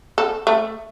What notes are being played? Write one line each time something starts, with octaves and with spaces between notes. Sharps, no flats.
A4
A3